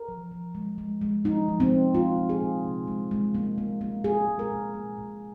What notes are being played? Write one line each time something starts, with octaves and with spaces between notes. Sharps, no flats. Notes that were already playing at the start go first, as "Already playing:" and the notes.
Already playing: A#4
F3
F3
G#3
G#3
G#3
F3 D#4
F3
C4
A#2
A#2 F4
A#2
G#4
A#2
C3
G#3
G#3
A#3
A#3
A#3
A#2 G#4
G#3
A#4
A#2
A#3
A#2